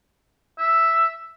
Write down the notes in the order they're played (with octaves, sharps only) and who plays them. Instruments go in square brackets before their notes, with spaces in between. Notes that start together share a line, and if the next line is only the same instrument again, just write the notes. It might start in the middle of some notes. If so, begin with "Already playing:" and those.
[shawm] E5